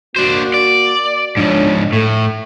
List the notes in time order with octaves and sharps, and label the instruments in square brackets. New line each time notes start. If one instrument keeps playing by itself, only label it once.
[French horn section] A#3 F#4 [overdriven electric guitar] D4 C5
[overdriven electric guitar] D5
[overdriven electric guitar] G#2 F3 [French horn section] D4 C#5
[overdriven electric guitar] A2 [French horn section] A3